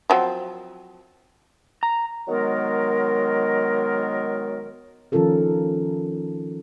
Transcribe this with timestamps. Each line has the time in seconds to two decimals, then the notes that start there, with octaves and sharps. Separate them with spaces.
0.10 F3 F#3 C4
1.83 A#5
2.28 D#3 F#3 G#3 B3 A#4
5.12 D#3 F3 C#4 F4 A4 A#4